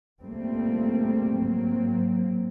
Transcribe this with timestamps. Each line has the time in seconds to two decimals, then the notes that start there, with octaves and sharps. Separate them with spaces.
0.21 C#2 C#3 G3 A3 A#3 C4
1.33 G#2 F#3 A#3 C4